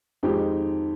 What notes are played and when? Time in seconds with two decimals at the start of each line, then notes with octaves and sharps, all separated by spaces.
0.23 F2 D#3 G#3 D#4 G4